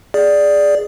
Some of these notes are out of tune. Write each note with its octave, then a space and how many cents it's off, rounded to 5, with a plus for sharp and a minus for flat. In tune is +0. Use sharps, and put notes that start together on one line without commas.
G#4 +0 D5 +0